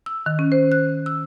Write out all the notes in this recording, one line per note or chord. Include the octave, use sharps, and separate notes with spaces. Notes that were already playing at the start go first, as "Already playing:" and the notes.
E6
D#3
C#4
C5
F#6
E6